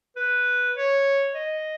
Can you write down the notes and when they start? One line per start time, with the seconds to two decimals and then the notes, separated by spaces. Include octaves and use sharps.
0.16 B4
0.75 C#5
1.34 D#5